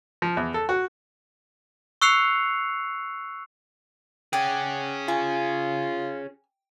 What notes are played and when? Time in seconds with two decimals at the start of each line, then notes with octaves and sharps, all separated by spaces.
0.22 F3
0.37 E2
0.54 A4
0.69 F#4
2.02 C#6 E6 F#6 C7 C#7 F7
4.33 C#4 G#4 D5 F#5 G5
5.08 F4 G#5